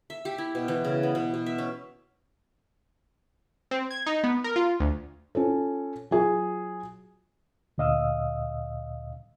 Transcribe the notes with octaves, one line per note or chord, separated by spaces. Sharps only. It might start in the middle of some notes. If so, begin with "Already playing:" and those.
E5
G4
E4
B2
E3
C#3
B3
B2
B2
E5
C#4
C4
G#6
D#4
B3
A#4
F4
D2
C#4 F4 A4
F#3 F4 G#4
D2 A#2 D#5 F5 D#6 E6